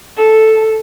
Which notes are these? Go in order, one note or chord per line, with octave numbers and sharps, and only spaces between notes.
A4